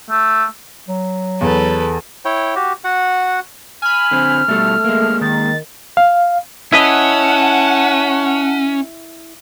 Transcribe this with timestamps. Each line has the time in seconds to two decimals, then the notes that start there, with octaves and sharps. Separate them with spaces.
0.10 A3
0.89 F#3
1.41 E2 A4 B4
2.25 E4 C#5 G5
2.55 F#4 G4
2.84 F#4 F#5
3.82 G#5 B5 F6
4.11 D3 C4
4.48 B2 G3 A3 A4
4.84 G#3 A#3
5.21 D#3 A6
5.97 F5
6.72 C#4 E4 B4 D#5 F#5 A5